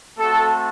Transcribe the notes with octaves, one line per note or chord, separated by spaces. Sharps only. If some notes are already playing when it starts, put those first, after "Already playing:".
A3 C4 F#4 A4